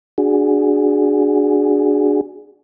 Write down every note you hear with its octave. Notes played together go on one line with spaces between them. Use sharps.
D4 F#4 G#4